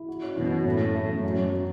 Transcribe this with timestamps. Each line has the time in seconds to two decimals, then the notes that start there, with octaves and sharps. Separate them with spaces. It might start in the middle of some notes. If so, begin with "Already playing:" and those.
Already playing: E4
0.08 F#4
0.22 C#4
0.36 F#2 B2 E3
0.52 F#4
0.65 A2 C#4
0.81 A3
0.95 A3
1.09 F#3
1.23 F#2 C#4
1.39 F#3
1.52 F#3